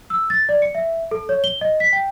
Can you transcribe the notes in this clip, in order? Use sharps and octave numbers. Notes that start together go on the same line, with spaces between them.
E6
A6
D5
C#7
E5
A4
C#5
G7
D#5
B6
G5